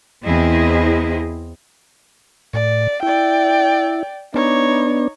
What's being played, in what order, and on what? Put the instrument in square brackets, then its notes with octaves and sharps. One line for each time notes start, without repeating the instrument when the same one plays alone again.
[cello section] E2 C4 E4 G#4 D#5
[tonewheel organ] A2 [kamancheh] D5
[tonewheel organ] E4 [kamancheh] D5 G5
[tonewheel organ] B3 D4 [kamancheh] D#4 C#5